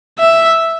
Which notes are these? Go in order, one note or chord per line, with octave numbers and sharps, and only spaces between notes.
E5